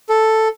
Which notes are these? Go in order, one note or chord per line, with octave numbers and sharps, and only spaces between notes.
A4